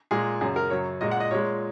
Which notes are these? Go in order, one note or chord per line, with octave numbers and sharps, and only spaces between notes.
A#2 G#3 G#4
F#2 C#3 F#3 G#4
A#4
F#2 C#3 F#3 C#5
A#2 G#3 D#5
F#5
D#5
A#2 G#3 C#5